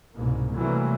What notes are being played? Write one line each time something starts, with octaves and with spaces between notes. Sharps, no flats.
C2 G#2 B2 A#3
C3 E3 F#3 G3 A3 A#3